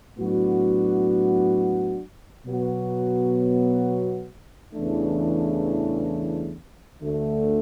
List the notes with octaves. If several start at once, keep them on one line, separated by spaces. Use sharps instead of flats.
A2 F#3 B3 D4 F#4
B2 F#3 B3 F#4
E2 C#3 E3 A3 D4
D2 D3 A3